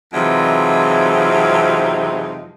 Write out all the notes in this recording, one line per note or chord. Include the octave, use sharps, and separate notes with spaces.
F2 C3 E3 F#3 G#3 D#4